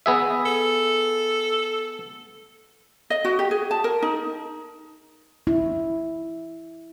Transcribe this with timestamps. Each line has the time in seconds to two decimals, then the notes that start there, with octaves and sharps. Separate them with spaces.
0.06 B3 G#4 E5
0.46 A4
3.10 D#5
3.25 F#4
3.39 G4
3.51 G#4
3.71 A5
3.84 A#4
4.02 D#4
5.47 E4